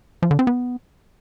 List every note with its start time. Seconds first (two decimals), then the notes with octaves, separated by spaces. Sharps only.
0.23 F3
0.31 D3
0.39 C4
0.47 B3